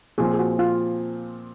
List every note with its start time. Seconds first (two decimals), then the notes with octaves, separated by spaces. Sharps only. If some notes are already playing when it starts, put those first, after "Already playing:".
0.18 A#2 F3 C4 G#4
0.33 G#4
0.39 F#4
0.59 F4